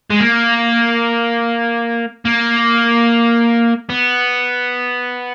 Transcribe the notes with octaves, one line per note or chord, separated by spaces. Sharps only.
G#3
A#3
A#3
B3